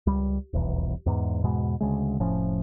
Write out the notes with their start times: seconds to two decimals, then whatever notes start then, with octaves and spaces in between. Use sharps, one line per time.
0.07 C#2 G3
0.53 D#1 B1 E2
1.06 E2 G#2
1.43 E2 G#2 B2 G#3
1.81 D2 C#3 G#3
2.20 F1 A2 F3 C#4